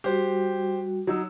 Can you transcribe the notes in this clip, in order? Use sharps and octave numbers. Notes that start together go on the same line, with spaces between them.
G3 F#4 G4 C5
F#3 D#4 E6